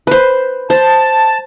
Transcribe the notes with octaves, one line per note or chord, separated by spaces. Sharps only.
B4 C5
C5 A5